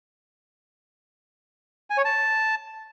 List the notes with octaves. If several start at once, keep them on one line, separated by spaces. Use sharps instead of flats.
G#5
C#5
A5